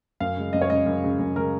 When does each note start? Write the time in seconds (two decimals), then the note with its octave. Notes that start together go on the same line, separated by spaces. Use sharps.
0.20 F#2 F5
0.37 C#3 G#3
0.53 F#2 D#5
0.61 C#5
0.70 C#3 G#3 D#5
0.86 F#2
1.03 C#3 G#3
1.19 F#2
1.36 C#3 G#3 A#4